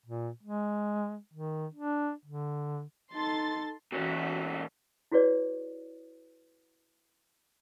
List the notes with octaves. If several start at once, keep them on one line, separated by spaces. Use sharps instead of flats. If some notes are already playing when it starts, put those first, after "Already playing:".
A#2
G#3
D#3
D4
D3
D#4 A4 C6 A6
A#2 E3 C#4 F#4 E5
E4 F#4 G#4 B4 C#5 D5